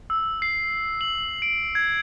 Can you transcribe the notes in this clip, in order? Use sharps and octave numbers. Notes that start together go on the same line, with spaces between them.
E6
C7
F#7
D7
G#6